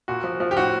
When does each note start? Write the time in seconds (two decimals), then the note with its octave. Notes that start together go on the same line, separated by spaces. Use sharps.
0.08 A#2 F#4
0.24 F3
0.40 F3
0.51 G4
0.57 A2 F#4